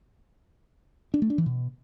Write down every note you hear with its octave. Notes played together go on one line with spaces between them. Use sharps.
D4
A3
D4
E3
B2